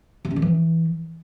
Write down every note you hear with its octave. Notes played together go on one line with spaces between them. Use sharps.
C3
C#4
D3
E3